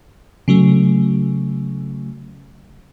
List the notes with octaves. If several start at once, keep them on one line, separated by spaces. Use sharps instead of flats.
C#3 F#3 A3